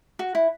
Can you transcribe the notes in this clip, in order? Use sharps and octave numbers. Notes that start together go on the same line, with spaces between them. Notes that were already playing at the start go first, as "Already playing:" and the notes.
F#4
E4